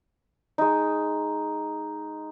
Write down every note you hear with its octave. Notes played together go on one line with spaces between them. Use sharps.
G#3 D#4